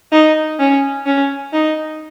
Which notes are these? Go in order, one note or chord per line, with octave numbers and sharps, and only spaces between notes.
D#4
C#4
C#4
D#4